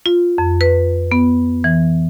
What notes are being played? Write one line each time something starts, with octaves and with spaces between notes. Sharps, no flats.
F4
F2
B4
B3
E3